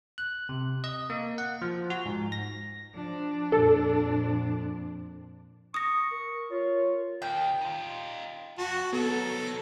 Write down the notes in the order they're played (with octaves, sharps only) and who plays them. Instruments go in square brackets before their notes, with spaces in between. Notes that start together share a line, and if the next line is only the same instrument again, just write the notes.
[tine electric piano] F#6
C3
D#5
A#3
F#5
F3
F#4
G#2
A#6
[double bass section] F3 [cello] D4
[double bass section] F2 A#2 [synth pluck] A4
[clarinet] C#6 [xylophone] D#6 A#6
[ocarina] A#4
[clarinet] F4 [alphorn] C#5
[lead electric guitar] D#2 D#3 [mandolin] G5
[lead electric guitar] D#4 F4
[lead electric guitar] F2 [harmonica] F#4
[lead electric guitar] D#3 F#3 [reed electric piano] B3 [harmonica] A4